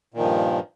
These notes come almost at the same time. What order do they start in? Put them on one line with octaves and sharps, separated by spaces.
A#2 D#3 F3 G2